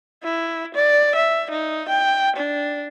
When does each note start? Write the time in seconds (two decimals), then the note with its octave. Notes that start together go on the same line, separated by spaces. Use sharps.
0.24 E4
0.75 D5
1.16 E5
1.51 D#4
1.89 G5
2.37 D4